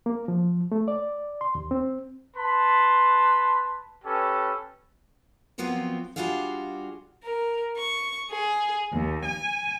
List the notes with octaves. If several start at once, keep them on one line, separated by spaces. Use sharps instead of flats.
A#3
F3
A3
D5
C6
D#2
C4
B4 A5 B5 C6
C#4 G4 A4 B4
F3 F#3 B3 C4 F4 A#4
G3 D4 F4 F#4 G#4 F5
A#4
C#6
G#4
D#2
G#5